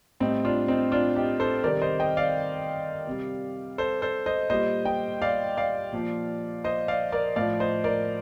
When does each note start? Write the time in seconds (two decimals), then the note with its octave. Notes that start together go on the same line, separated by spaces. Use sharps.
0.20 A2 G3 C4 D#4
0.45 D4 F4
0.68 C4 D#4
0.92 D4 F4
1.16 D#4 G4
1.40 A4 C5
1.63 C3 D#3 G3 A#4 D5
1.81 C5 D#5
2.00 D#5 G5
2.17 D5 F5
3.07 C3 G3
3.78 A4 C5
4.02 A4 C5
4.26 C5 D#5
4.50 A#2 G3 C5 D#5
4.85 D#5 G5
5.22 D5 F5
5.57 D5 F5
5.93 A#2 F3
6.64 C5 D#5
6.88 D5 F5
7.12 A#4 D5
7.36 A2 F3 D5 F5
7.60 C5 D#5
7.84 A#4 D5